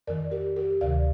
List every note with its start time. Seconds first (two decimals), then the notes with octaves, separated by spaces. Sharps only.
0.07 F2 D#3 A#4 D5
0.31 G4 A#4
0.56 G4 A#4
0.81 D2 C3 D#3 D5 F5